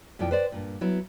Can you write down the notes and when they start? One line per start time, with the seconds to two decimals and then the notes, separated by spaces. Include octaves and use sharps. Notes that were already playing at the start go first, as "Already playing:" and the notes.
0.19 F2 B2 E4 F4 D5 G5
0.31 B4 C5 D5
0.52 G2 A#2
0.81 F#3 B3 E4